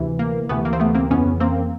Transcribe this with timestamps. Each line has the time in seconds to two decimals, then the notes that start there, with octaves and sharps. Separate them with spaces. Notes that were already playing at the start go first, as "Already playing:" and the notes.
Already playing: D2 C3 E3
0.19 A#3
0.49 D2 C3 E3 A3 B3
0.65 A#3
0.73 C4
0.80 A3 B3
0.95 A#3 C4
1.10 F2 C#3 E3 B3 C#4
1.40 A#3 C4